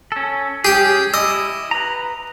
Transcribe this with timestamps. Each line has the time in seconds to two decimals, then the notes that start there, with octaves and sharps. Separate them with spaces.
0.12 C#4 A4
0.65 C#4 G4 G#4 G5
1.14 E4 D#5 D6 E6
1.71 B4 A#5